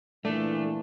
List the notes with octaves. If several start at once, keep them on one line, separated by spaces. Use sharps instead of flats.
A#2 E3 A3 D4